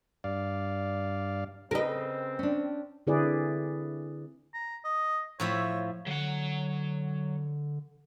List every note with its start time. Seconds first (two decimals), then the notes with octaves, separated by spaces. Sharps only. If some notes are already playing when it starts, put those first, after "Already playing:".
0.24 G2 D5 F5
1.71 C#3 C4 A#4 B4 D#5
2.39 C#4 D4
3.07 D3 C4 E4 G#4 B4 D5
4.54 A#5
4.85 D#5
5.40 A2 F3 C#5 E5
6.07 D3 F#3 F#5